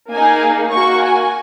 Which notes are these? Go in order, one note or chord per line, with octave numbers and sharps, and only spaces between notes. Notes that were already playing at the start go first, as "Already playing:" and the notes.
A#3 D#4 G#4 G#5
A#3 F#4 C#6
G#5